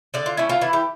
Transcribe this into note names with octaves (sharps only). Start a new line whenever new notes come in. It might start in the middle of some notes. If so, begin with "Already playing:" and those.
D3 D5
F4
A3 C#4 E4
F4
E3 E4
G4